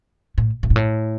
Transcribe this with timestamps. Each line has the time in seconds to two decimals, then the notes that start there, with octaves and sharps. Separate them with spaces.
0.38 A2
0.63 A#2
0.70 G#2
0.76 A2